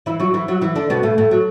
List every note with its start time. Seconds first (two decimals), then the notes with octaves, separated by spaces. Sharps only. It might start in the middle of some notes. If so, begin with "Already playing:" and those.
0.06 E3 E4
0.20 F#3 F#4
0.34 E3 E4
0.48 F#3 F#4
0.62 E3 E4
0.76 D3 D4
0.90 B2 B3
1.03 A2 A3
1.18 A2 A3
1.31 F#3